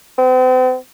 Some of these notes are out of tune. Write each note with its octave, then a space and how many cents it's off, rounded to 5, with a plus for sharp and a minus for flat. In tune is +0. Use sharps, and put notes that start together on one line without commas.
C4 -40